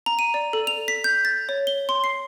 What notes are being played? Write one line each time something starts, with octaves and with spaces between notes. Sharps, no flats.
A#5
D#7
D5
A4
F7
B6
G6
A6
C#5
G7
C6
C7